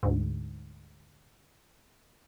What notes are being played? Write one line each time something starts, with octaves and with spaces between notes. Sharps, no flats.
D2 G#2